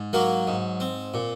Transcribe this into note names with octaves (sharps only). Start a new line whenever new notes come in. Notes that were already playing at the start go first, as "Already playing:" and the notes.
Already playing: G#2
F#3 A#3 A#4
G#2
C4
A#2